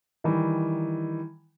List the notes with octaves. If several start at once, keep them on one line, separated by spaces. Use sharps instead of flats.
D#3 E3 G3